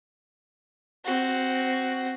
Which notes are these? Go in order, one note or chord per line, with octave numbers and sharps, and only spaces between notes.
C4 F#4